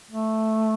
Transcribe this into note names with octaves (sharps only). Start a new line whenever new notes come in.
A3